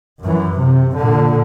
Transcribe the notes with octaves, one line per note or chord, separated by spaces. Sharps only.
F#2 E3
C3
A#2 D3